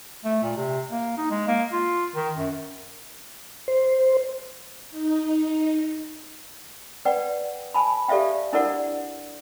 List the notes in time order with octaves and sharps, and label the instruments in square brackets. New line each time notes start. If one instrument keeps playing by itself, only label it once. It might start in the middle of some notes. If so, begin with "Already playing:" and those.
[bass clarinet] A3
A#2
C3
A#3
D#4
G#3
A#3
F4
D#3
F#2
[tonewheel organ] C5
[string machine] D#4
[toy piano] B4 D5 F#5 G5
G#5 A5 B5
G4 A4 D5 E5 F5 G5
D4 E4 A4 A#4 D5 F#5